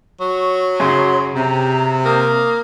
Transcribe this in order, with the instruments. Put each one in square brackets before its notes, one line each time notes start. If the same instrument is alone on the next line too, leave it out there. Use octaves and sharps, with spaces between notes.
[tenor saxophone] F#3 [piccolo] C#6
[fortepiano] F#2 C#3 [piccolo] C6
[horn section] C3 [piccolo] A#5
[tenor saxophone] A#3 [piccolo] D#6